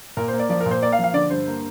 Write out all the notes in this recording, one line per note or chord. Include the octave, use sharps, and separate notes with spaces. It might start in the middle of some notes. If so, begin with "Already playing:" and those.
A#2 A#4
C5
A#3
D5
F3 D5
A#4
A#2
C5
A#3 D5
F5
F3
F5
D3 D5
G2 C5
A#3